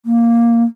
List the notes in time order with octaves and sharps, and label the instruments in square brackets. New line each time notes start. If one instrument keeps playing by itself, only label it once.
[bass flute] A#3